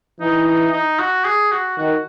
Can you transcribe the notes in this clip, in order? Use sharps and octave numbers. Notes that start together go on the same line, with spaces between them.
E3 D#4
D#4
D#4
F#4
G#4
F#4
D#3 F#4